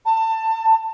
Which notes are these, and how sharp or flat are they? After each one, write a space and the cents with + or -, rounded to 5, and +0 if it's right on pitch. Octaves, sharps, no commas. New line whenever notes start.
A5 +25